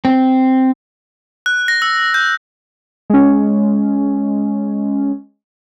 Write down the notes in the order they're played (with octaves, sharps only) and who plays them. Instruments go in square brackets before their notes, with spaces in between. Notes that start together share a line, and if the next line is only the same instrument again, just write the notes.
[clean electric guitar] C4
[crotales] F#6
A#6
E6
G6
[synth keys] G#3 C#4